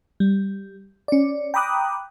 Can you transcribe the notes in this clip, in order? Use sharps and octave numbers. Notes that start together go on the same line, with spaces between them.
G3
C#4 D5
G5 A#5 B5 D6 D#6 F#6